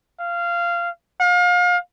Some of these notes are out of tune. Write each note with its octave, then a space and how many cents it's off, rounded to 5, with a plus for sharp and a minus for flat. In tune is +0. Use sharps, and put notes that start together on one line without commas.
F5 -15
F5 +35